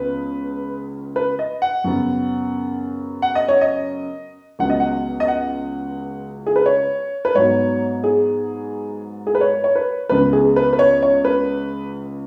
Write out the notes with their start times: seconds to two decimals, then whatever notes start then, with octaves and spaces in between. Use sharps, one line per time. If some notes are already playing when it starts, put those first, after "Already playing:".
Already playing: C#2 C#3 B3 B4
1.16 B4
1.39 D#5
1.62 F#5
1.84 F#2 C#3 B3
3.22 F#5
3.35 D#5
3.48 C#5
3.61 D#5
4.59 C#2 C#3 F#3 B3 F#5
4.70 D#5
4.80 F#5
5.20 D#5
5.28 F#5
6.47 G#4
6.56 B4
6.66 C#5
7.25 B4
7.35 G#2 F#3 B3 C#5
8.04 G#4
9.27 G#4
9.35 B4
9.41 C#5
9.64 C#5
9.75 B4
10.09 C#2 C#3 B3 B4
10.33 G#4
10.56 B4
10.73 B4
10.79 C#5
11.02 C#5
11.25 B4